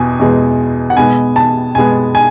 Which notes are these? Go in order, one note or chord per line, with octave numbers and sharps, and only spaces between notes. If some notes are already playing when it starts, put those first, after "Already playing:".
Already playing: E2 B2 G#5
E2 B2 G#3
F#5
B2 G#3 B3 G#5
A5
B2 G#3 B3 G#5
G#5